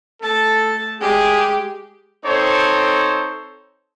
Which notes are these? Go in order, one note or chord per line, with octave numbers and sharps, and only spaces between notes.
A3 A4 A5
G#3 G4 G#4
C4 D#4 A4 C5 C#5